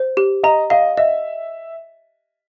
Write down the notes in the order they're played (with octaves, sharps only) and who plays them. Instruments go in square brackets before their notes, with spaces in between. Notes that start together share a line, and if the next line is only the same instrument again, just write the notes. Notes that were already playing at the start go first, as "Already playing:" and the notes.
Already playing: [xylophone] C5
G4
[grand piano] D#5 [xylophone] A#5
[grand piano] D#5 [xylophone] F5
[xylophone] D#5 [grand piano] E5